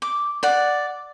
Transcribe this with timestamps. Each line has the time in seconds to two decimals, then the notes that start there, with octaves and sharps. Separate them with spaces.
0.02 D6
0.43 D5 F#5